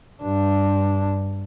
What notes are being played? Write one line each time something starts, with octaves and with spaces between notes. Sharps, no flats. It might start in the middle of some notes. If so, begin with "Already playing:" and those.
G2 D4